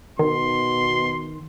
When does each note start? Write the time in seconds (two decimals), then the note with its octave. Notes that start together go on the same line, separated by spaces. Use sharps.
0.19 B2 D#3 C6